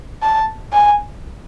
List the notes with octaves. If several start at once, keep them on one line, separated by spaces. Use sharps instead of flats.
A5
G#5